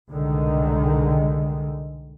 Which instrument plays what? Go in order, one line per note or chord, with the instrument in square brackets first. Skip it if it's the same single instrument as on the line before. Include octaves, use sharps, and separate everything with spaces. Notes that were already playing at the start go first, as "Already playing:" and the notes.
[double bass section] C2 B2 D3 D#3 G#3